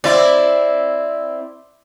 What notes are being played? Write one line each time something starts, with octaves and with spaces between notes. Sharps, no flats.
C4 E4 D5